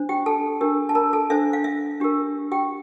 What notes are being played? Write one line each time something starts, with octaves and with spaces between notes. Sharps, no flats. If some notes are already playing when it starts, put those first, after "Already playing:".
Already playing: D4 C5
G4 G5
A4 A5
D4 G4 A#4
A5
A#4 A#5
A4 A5
D4 A4 C5 E5
F5
E5
D4 G4 A#4
G4 G5